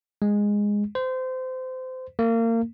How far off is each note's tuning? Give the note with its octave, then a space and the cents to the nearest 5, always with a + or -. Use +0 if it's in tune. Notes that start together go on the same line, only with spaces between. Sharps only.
G#3 -10
C5 -25
A#3 -30